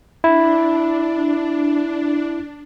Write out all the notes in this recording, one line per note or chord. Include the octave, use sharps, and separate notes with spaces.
D4 E4